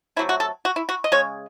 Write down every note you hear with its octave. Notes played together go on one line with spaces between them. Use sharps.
C3 F#3 A3 E4
F#4
A4
F#4
E4
F#4
D#5
C#3 G#3 C#5